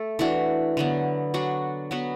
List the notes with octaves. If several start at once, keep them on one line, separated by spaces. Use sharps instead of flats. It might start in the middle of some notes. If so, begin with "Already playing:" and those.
Already playing: A3 A4
E3 D4 F#4
D3 F#3 B3
F#3 D4 F#4
F#3 B3 F#4 B4